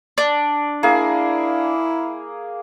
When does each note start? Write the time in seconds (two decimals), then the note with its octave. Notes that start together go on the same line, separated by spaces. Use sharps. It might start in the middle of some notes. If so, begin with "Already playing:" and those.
0.18 D4
0.83 A#3 E4 G#4